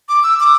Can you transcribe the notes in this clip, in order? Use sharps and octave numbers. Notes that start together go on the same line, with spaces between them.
D6
E6
D6